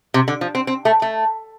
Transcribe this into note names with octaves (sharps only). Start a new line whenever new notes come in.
C3
D3
F3
C4
C4
A3
A3